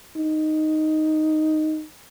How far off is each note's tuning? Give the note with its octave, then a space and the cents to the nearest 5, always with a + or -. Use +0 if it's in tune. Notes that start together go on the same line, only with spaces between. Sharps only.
D#4 -5